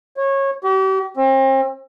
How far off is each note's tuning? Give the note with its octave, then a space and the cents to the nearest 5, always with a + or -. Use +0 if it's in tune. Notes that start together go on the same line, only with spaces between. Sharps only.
C#5 -20
G4 -40
C4 +40